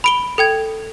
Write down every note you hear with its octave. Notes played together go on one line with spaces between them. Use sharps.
B5 D7 G7
A4 G5 G#6